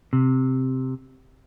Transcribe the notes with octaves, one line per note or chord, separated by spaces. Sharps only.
C3